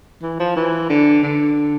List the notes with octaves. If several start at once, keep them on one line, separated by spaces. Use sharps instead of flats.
E3
F3
E3
D3
D3